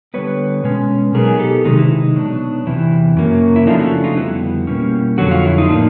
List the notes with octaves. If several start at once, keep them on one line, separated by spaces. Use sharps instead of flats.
D3 G3 B3 B4 C#5
B2 G#3 C#4
B2 F#3 B3 D#4 G#4 A#4
G4 A4
C3 D#3 G#3 D#4
E4
D#4
B2 F#3 B3 D4
E2 C3 E3 E4
F#2 C#3 F#3 A#3
E4
C#3 F3 A3 D4 D#4 F4
E4 F#4
D#4 F4
F2 D3 G3 B3 E4 F#4
B2 G3 A#3 C#4
F2 D3 F#3 F#4
F4
E4
D#4 F4
A2 F3 A#3 D4